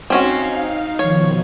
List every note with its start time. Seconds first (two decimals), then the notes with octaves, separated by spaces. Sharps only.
0.10 C4 C#4 D#4 F#4 F5
0.99 B2 D#3 F3 C#5